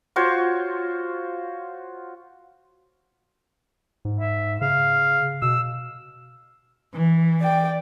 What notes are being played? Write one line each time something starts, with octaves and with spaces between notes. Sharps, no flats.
F4 F#4 C5 C#5
G#2
E5
C#3 F5
B2 E6
E3
D5 G5